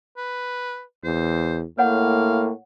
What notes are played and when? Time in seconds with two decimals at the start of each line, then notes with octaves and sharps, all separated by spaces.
0.17 B4
1.04 E2 C5
1.78 A2 A#3 C#5 F5 F#5